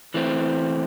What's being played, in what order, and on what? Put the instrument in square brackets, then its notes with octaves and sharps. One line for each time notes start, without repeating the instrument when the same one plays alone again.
[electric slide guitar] E3 A3 C4